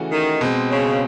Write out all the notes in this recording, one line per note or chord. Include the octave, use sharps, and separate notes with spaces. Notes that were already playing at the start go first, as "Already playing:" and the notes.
Already playing: C#3 E3 A3 C#4 F#4
D#3
B2 G#3 C4
C#3